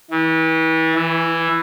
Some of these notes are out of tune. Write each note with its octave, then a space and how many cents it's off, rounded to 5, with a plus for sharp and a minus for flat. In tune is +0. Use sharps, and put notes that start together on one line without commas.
E3 -35
E3 +5